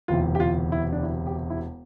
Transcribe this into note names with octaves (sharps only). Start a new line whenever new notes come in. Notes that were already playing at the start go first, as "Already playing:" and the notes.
E1 D2 C3 E3 F4
G4
F4
E4
D4
E4
G4
E4